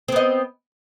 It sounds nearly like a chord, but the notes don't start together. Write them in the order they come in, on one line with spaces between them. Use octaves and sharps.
C4 B3 D#5